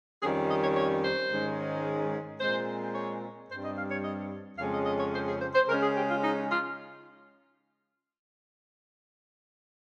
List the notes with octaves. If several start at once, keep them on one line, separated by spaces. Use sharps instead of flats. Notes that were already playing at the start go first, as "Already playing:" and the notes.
F2 D#3 G3 C#4 G#4
D#5
C#5
C#5
C5
G#2 D#3 G#3 C#4
A#2 G#3 C4 C5
C#5
G2 G3 C4 C5
D#5
F5
C#5
D#5
F2 C#3 G#3 C#4 F5
D#5
D#5
C#5
C5
G#4
C5
C5
C#3 G#3 C#4 A#4
G#4
G4
F4
D#4
F4